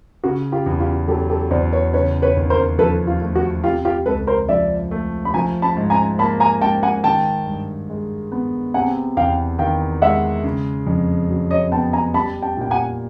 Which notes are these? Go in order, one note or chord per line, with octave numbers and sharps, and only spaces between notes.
C#3 F#4
F4 G4
E2
F4 G4
F#3 G4 A4
G4 A4
E2 C5 D5
B4 C#5
C#3 B4 C#5
B4 C#5
D#2
A#4 C5
F3 A4 B4
F4
A3
F#4
C3 F4 G4
F4 G4
C#2 A4 B4
A#4 C5
F3 D5 E5
A3
B5
F3 G#5 A#5
A5 B5
G#2
G#5 A#5
A#3 A5 B5
G#5 A#5
G#2 G5 A5
F#5 G#5
D#3 G5 A5
G2
G#3
B3
C3 F#5 G#5
E2 F5 G5
D#3 F5 G5
G#3 E5 F#5
C#3
F2
F#3
C#5 D#5
B3 G5 A5
G#5 A#5
G3 A5 B5
G5 A5
A#2 G5
F#5 G#5